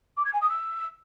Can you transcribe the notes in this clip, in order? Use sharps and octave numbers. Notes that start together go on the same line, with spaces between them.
D6
G#6
G#5
D#6
E6